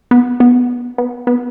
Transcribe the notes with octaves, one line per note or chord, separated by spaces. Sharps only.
B3
B3
B3
B3